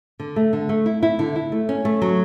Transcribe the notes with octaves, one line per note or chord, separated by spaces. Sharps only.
D3
A3
D3
A3
E4
E4
D3
E4
A3
C#4
A3
F#3